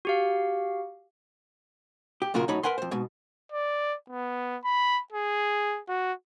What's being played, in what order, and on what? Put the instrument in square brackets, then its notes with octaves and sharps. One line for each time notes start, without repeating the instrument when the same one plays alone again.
[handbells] F#4 G4 F5
[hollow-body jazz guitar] G4
F#2 A#2 C#3 F4 F#4 A#4
F#2 A2 D#4 C#5 B5
A#4 B4 F#5 G#5 C6
F2 C5
G#2 B2
[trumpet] D5
B3
B5
G#4
F#4